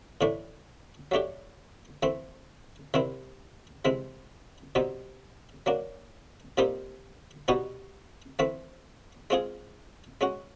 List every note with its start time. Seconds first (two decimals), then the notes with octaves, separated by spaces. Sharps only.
0.21 A2 E3 A3 D4
1.11 F#3 A3 D4 G4
2.03 E3 A3 C4
2.94 C3 D#3 G3 C4 E4
3.85 C3 E3 G#3 C4
4.75 B2 G3 C4 D#4
5.66 F#3 A#3 D4
6.58 A#2 G3 C4 D#4 G4
7.48 B2 G3 B3 D#4 F#4
8.39 E3 A3 C4
9.30 G#3 C4 F4 G#4
10.21 G#3 C#4 F#4